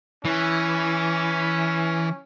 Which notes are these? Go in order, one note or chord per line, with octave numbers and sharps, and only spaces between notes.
E3 C#4